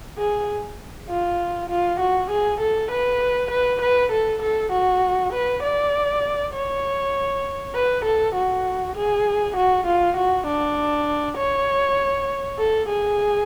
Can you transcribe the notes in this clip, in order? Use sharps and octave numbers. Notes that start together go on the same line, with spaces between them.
G#4
F4
F4
F#4
G#4
A4
B4
B4
B4
A4
A4
F#4
B4
D5
C#5
B4
A4
F#4
G#4
F#4
F4
F#4
D4
C#5
A4
G#4